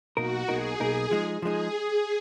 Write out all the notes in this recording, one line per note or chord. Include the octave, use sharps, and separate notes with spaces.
B1 B2 A#3 D#4 F#4 A#4
B1 B2 A#3 D#4 G#4 A#4
B1 B2 A#3 D#4 A#4
F3 G#3 D#4 G#4
F3 G#3 D#4 G#4